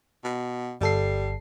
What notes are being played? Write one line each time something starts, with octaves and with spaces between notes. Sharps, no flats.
B2
G1 G3 A4 C7